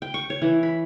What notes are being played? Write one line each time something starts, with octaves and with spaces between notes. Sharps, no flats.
G5
C#6
C#5
E3
B5